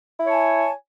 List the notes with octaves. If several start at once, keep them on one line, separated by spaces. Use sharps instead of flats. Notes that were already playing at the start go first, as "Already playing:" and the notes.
E4 C#5 G#5 A5